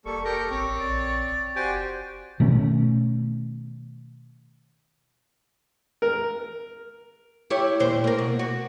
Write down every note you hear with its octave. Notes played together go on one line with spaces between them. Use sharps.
F1 G3 A#3 A4 C#6
G4 A4 A#4 C#6 G6
A1 C4 C#5 D6
A#1 D5
F#1
F#4 G4 C5 D5 G#5
B2 D#3 A3 C#4
A#4
E4 G4 C#5
D#2 A#2 C5
A#3 A#4
B2
F#4